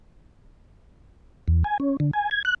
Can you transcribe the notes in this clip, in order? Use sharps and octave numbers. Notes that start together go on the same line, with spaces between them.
E2
G#5
C#4
D3
G#5
G#6
F#6